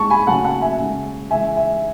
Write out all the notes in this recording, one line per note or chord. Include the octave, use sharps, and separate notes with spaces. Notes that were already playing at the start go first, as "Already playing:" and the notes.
Already playing: A2 G#3 A5 C#6
G#5 B5
C#3 F#3 A3 F#5 A5
F#5 A5
E5 G#5
C#3 G#3
C#3 E3 G#3 E5 G#5
E5